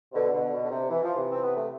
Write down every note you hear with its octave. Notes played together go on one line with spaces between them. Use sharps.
C3
B2 D3
B2 D3
B2
D3
C3
E3
F3
C3 E3
C4
B3
A3